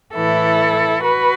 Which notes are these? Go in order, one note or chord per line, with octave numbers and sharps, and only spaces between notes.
A2 E3 E4 A4
F#4 B4